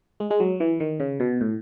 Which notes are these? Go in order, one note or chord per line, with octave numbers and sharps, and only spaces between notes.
G#3
G#3
F#3
E3
D#3
C#3
B2
A2